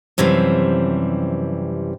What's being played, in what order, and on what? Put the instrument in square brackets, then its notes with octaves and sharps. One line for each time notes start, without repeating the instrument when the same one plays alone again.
[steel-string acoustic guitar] F#2 C3 E3 F3 G3